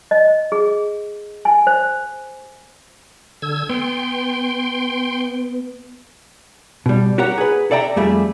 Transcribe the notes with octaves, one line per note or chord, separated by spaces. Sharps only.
D#5
G#4
G#5
C5
D3 E6 G#6
B3 G5 C6
B2 G3
F#4 G4 A#4 C#5 F#5
G#4 B4
A4 D5 E5 G5 A#5
F2 G3 A3 G#4 E5